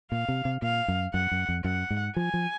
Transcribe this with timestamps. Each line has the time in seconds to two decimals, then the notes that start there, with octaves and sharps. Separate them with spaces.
0.12 A#2 F5
0.28 C3
0.45 C3
0.62 A#2 F5
0.88 F#2
1.14 F#2 F#5
1.32 F#2
1.49 F2
1.64 F#2 F#5
1.90 G#2
2.16 F3 G#5
2.34 F3